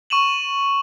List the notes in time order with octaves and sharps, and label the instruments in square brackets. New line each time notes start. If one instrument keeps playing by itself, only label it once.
[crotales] C#6 D#7 E7 F#7